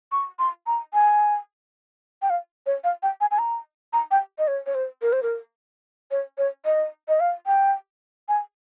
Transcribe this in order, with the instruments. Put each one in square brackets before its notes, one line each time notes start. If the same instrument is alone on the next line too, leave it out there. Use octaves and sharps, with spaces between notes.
[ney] C#6
C6
A#5
G#5
G5
F5
C#5
F5
G5
G#5
G#5
A#5
A#5
G5
D#5
C#5
C#5
C5
A#4
C5
A#4
C#5
C#5
D#5
D#5
F5
G5
G#5